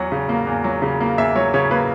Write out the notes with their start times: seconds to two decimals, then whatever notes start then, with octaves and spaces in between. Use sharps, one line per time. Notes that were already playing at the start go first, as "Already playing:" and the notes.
Already playing: E2 F#3 F#5
0.12 C#3
0.29 A#3
0.47 E2
0.64 F#3
0.82 C#3
1.01 A#3
1.18 E2 E5
1.36 F#3 C#5
1.54 C#3 C#5
1.71 A#3 B4